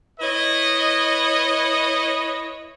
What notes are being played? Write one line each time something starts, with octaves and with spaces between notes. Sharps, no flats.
E4 B4 C#5 D#5